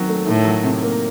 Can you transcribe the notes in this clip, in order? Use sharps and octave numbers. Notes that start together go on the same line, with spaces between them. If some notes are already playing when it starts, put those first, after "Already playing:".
Already playing: D#3 F#3 C4
A3
A2 D#3
F#3
C3
A#3